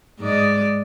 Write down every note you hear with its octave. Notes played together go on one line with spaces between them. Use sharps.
G#2 G#3 D5